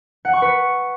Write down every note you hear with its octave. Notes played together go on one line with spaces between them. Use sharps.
F#5
C#6
B4